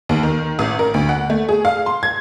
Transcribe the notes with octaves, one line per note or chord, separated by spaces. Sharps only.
D#2
D#3
A1
A#4
D2
F#5
A3
G#4
F5
C6
G#6